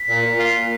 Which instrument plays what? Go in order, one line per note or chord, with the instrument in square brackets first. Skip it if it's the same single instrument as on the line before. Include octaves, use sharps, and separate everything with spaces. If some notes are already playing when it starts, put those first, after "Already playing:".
Already playing: [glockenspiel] B6
[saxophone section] A#2
A#2
F4
A#2